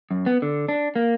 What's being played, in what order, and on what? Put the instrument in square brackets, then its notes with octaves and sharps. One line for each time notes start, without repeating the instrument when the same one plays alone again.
[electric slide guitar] F#2
B3
D3
D4
A#3